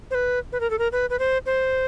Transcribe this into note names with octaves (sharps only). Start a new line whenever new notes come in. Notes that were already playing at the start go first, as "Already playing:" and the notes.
C5
B4
B4
A#4
A4
A#4
B4
B4
C5
C5